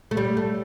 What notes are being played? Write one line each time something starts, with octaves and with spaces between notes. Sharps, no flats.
A3
G3
A3